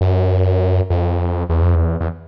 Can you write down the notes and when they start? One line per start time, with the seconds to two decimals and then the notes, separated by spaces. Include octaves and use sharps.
0.01 F#2
0.90 F2
1.49 E2
1.62 F2
1.75 E2
2.01 E2